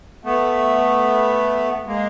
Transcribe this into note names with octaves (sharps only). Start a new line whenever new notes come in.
A3 B3
G#3 A#3